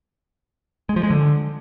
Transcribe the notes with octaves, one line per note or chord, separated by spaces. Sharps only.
G#3
F3
G#3
D3